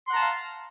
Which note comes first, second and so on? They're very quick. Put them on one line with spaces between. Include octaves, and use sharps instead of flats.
C6 F#5 A#5 A5 F5